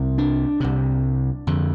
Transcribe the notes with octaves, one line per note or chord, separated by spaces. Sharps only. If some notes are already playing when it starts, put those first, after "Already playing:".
Already playing: C2 C3
D4
C2 C3
F2 D3